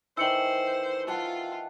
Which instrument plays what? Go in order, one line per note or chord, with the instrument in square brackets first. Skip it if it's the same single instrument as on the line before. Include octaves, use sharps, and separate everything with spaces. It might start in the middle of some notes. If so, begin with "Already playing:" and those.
[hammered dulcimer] D#3 E3 [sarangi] C5 [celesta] E6 C#7 F#7
[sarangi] F4 [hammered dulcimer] F#5 A5